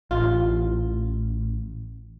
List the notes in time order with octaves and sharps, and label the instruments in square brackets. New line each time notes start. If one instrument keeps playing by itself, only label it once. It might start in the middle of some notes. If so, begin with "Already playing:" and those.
[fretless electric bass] A1 [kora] F4